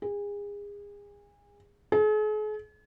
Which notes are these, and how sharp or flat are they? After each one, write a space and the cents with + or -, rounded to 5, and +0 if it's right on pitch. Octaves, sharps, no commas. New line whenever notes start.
G#4 -30
G#4 +45